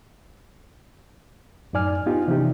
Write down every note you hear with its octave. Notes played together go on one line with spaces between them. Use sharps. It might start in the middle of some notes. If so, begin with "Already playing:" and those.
F#2 A2 D#4 D5 G#5 F6
B3 D#4 F4 G4
C3 E3 F3 C#4 D#4 G4